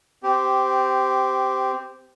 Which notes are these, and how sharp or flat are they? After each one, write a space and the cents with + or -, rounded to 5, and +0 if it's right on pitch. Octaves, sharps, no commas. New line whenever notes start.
C4 -15 G4 -5